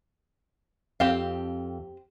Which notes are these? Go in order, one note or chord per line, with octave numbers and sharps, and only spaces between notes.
F2 C4 G4 F5